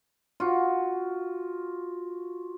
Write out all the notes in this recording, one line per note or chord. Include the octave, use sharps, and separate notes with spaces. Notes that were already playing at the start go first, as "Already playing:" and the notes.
F4 F#4